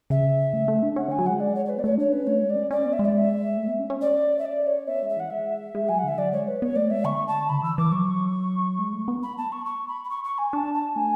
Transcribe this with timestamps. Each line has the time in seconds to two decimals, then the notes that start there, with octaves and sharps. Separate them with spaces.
0.10 C#3 E5
0.53 A3
0.68 A3
0.83 D4
0.96 C#4 F#5
1.08 D3 G#5
1.19 F#3
1.26 G#3 F#5
1.40 D5
1.55 C#5
1.65 C#5
1.69 B4
1.77 B3 D5
1.84 A3 C#5
1.98 D4 C#5
2.12 C#4 B4
2.27 A3 C#5
2.42 G#3
2.50 D5
2.56 C#4
2.71 C#4 D5
2.85 B3
2.93 E5
2.99 G#3
3.05 D5
3.17 E5
3.57 A3
3.68 B3
3.80 C#4
3.90 C#4
4.01 D5
4.39 E5
4.45 D5
4.66 C#5
4.87 B3 E5
5.03 G#3
5.09 E5
5.17 E3 F#5
5.30 G#3 E5
5.75 G#3
5.88 F#3 G#5
5.98 F#5
6.04 D3 E5
6.18 F#3 D5
6.32 G#3 C#5
6.48 B4
6.62 B3 C#5
6.76 A3 D5
6.90 G#3 E5
7.05 D3 C#6
7.27 A5
7.49 C#3 B5
7.62 E3 E6
7.78 E3 D6
7.92 F#3 C#6
8.79 G#3
8.93 A3
9.08 B3
9.23 B5
9.37 A5
9.52 C#6
9.65 C#6
9.88 B5
10.04 B5
10.09 C#6
10.24 C#6
10.38 G#5
10.53 D4 A5
10.74 A5
10.96 A3 G#5